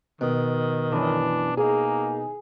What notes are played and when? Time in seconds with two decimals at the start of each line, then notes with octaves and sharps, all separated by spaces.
0.21 B2 D#3
0.92 F#2 E3 D4
1.57 A#3 D#4 G#4